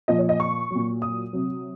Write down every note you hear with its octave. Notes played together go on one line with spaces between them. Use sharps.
A#2 F3 D#5
C#5
D#5
C#6
A#2 F#3
D#6
C3 F#3